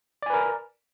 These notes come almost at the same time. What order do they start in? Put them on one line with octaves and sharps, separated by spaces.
D5 G#5 B4 A#4